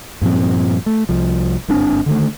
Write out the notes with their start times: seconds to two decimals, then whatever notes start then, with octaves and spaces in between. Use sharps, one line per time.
0.22 G2 A#2 F3 C4
0.86 A3
1.09 C2 F3
1.68 G1 G#2 C4 D4
2.06 D3 D#3 A3